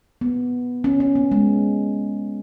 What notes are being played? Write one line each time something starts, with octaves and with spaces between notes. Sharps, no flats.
B3
C#4
C#4
B3
G#3